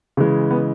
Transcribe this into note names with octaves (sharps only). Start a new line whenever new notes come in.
C#3 E3 G#3
B3